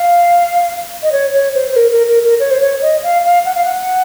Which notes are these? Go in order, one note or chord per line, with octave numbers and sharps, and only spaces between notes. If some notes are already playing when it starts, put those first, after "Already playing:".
Already playing: F5
D#5
C#5
C#5
C5
C5
A#4
A#4
A#4
A#4
C#5
C5
C#5
D#5
F5
F5
F#5
F5
F#5